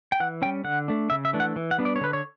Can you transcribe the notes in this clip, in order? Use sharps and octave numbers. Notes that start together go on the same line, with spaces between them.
G5
E3 F#5
G3 C#4 G5
D3 F#5
A3 D4
C#3 E5
E5
E3 A3 D4
F#5
E3
F#5
G3 B3 D4
D5
C#5
D3 B4
C#5